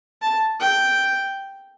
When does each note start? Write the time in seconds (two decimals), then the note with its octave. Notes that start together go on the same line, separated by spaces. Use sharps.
0.22 A5
0.60 G5